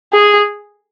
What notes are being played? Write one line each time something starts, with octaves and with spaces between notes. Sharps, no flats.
G#4